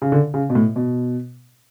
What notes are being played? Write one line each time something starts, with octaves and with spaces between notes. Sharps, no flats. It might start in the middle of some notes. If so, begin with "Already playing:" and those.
C#3
D3
C#3
B2
A2
B2